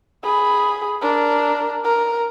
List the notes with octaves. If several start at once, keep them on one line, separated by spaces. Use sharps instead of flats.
G#4 B5
D4 A#4
A#4